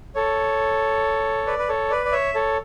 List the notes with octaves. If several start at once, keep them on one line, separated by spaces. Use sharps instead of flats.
A4 C#5
B4 D5
B4
A4 C#5
B4 D5
D5
C#5 E5
A4 C#5